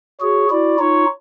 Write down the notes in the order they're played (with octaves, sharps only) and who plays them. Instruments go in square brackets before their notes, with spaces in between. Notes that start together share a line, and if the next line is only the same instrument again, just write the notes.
[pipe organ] F#4 G#4 [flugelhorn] C#5
[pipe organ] E4 F#4 [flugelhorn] D5
[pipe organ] D#4 F4 [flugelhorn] C#5